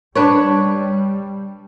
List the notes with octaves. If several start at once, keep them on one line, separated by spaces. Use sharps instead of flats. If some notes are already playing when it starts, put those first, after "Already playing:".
G3 D4 B4 C#5